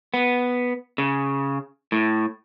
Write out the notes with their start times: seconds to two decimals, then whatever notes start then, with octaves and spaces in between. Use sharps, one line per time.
0.14 B3
0.98 C#3
1.92 A2